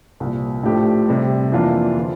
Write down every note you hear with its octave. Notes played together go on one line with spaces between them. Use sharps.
C2 A#2 F3
A2 F3 A3 D4 G4
C3 G3 C4
F2 E3 A#3 D4 F4
D3 F3